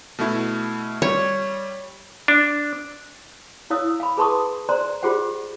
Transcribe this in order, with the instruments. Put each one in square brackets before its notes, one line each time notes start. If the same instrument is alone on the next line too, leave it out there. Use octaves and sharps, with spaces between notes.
[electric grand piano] B2 A3 E4
[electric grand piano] G3 [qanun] C#5
[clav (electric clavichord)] D4
[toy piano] E4 C#5 F5 D#6 E6
F5 B5
G#4 B4 A5 C6 C#6 D#6
C5 D5 A#5 C6
F4 G4 G#4 C5 F#5